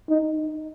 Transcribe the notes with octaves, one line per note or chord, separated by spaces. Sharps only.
D#4